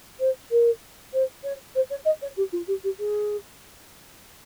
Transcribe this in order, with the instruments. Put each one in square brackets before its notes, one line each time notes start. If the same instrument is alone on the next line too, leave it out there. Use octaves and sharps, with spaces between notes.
[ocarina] C5
A#4
C5
C#5
C5
C#5
D#5
C#5
G4
F4
G4
G4
G#4